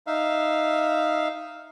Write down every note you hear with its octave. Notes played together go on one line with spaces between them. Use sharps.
D#4 E5 F5